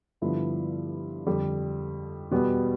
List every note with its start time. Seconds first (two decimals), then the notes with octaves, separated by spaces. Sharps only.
0.21 G2 D3 F3 B3 E4
1.26 F2 D3 G3
2.31 E2 B2 G3 B3